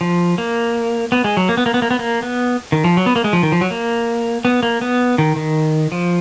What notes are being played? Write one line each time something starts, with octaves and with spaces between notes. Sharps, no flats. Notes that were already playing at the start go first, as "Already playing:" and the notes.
F3
A#3
B3
G#3
F#3
A#3
B3
A#3
B3
A#3
B3
A#3
B3
D#3
F3
F#3
B3
A#3
G#3
F3
D#3
F3
F#3
A#3
B3
A#3
B3
D#3
D#3
F3